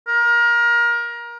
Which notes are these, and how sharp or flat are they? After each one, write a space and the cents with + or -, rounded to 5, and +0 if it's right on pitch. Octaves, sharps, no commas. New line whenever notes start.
A#4 +25